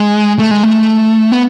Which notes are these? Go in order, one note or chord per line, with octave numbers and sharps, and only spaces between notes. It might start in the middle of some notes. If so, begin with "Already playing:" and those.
Already playing: G#3
A3
G#3
A3
B3